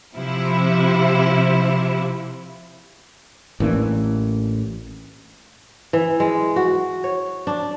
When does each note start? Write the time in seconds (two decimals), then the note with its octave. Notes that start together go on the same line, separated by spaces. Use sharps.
0.16 C3 F3 E4
3.60 A1 E3 A#3 D4
5.93 E3
6.20 G#3
6.56 F#4
7.04 C#5
7.47 D4